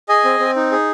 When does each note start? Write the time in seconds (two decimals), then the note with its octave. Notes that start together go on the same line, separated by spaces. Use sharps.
0.09 G#4 D#5 G#5
0.25 C4
0.39 C4
0.56 D#4
0.71 G#4